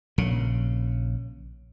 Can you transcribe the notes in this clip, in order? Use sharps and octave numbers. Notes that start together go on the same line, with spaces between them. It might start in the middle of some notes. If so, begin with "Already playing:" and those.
A#1 C#3